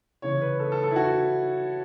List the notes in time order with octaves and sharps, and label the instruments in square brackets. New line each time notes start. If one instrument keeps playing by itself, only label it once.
[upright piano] C#3 E3 C#5
B4
A4
A4
A4
E4
F#4